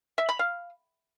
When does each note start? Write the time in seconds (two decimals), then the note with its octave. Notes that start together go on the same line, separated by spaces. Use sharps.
0.18 E5
0.29 B5
0.39 F5